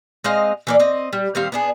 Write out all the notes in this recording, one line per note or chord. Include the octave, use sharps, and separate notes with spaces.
G#3 C4 D#5 F5
E3 A#3 D5
C4 D#5
G3
D#3 G3 C4 F5
B3 D4 G#4